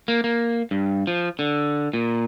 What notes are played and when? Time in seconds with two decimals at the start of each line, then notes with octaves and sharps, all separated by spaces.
0.08 A#3
0.24 A#3
0.71 G2
1.07 F3
1.39 D3
1.93 A#2